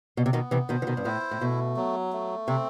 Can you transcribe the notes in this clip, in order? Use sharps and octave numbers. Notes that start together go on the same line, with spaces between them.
B2
C3
B2 D#3 B3
C3 E3
B2 D#3 C5
E3
B2 D#3
G2
A2 E4
A2
B2 A3
F#3
A3
C3 C4